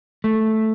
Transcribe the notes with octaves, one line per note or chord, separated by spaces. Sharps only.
A3